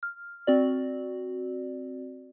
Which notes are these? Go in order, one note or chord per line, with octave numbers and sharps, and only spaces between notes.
F6
C4 F#4 D5